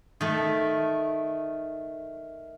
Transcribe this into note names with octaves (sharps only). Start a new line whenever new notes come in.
D#3 A3